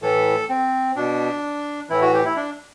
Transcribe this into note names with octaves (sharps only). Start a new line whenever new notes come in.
A2 E3 A4
C4
B2 D4
A2 E3 E4
F#4
G4
E4
D4